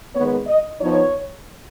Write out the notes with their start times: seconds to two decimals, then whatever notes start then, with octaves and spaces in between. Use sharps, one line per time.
0.15 D#3 G#3 B3 C#5
0.47 D#5
0.80 F3 B3 D#4 C#5